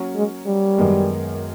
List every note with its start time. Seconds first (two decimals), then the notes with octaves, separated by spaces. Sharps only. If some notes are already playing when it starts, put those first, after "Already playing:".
Already playing: F#3 A#3 C#4 F#4 A#4
0.16 G#3
0.46 G3
0.78 F#2 D#3 G#3 B3